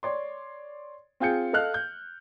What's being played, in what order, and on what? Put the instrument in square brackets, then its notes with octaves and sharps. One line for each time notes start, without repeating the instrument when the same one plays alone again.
[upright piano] C#5 D5 C6
C4 F4 G#4 G6 C#7
A4 D#5 F5 F6 F#6
G6